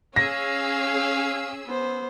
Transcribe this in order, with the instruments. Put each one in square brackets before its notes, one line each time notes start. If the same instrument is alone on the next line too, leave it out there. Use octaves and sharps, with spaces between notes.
[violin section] C#4 G#4 E6 [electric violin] C#5 [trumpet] F5 [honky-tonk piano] A#6
[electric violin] B3 C5